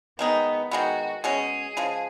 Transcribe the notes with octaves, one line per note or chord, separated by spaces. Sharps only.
D#3 G#3 B3 D#4
D#3 G#3 B3 F#4
B2 G#3 C#4 G#4
C#3 F3 G#3